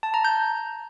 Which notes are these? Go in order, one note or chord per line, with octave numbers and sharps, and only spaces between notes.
A5
A#5
G6